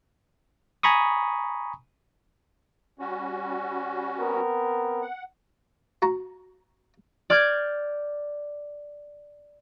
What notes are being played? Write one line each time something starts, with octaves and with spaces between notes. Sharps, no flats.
G#5 A#5 B5 C#6 D#6
G3 C#4 F#4
B3 C4 A#4
F#5
F#4 A#5
D5 D6 F6 G6 G#6